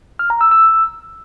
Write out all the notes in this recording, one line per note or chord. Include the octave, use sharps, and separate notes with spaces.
F6
A#5
E6
E6